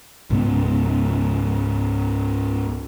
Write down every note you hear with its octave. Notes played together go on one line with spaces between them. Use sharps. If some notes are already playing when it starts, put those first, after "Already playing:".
C#2 G#2 C#3 B3